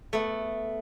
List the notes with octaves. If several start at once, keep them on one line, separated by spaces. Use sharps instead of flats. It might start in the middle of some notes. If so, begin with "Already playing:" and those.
A3 B3